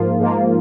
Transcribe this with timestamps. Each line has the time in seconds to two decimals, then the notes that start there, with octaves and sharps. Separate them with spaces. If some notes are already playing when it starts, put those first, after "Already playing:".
Already playing: G#2 F3 A#3 F4
0.20 G#2 F3 A#3 F4